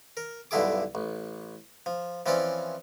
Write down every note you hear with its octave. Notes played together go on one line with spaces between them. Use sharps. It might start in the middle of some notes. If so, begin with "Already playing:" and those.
A#4
B1 G2 D3 E4 G#4 D6
A1
F3
E3 F3 C4 C#4 D5